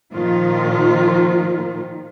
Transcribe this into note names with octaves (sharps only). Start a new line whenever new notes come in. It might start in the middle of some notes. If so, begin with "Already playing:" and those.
A#2 D#3 F3 F4